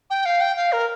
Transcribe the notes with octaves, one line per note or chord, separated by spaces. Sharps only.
G5
F5
G5
F5
A#4